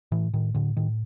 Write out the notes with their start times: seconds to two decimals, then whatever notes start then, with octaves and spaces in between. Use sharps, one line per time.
0.12 A2 E3
0.34 A2 D#3
0.54 A2 D3
0.77 A2 D#3